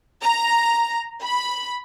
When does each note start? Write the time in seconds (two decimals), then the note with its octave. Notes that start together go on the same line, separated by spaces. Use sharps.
0.22 A#5
1.24 B5